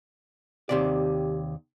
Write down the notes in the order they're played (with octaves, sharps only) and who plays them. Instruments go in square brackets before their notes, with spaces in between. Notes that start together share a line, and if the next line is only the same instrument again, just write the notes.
[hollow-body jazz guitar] D#2 C3 D5 [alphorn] G4